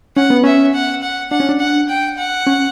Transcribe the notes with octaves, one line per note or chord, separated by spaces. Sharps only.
C#4 F#5
B3
C#4 E5
F#5
F#5
D4 F#5
C#4
D4
F#5
G5
F#5
C#4